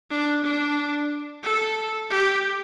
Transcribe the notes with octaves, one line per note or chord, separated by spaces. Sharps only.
D4
D4
A4
G4